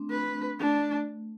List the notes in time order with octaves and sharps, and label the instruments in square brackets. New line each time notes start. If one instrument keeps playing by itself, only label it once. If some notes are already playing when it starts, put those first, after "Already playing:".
Already playing: [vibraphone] A3 C4 D4
[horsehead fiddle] B4
[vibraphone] A3 [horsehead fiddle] D4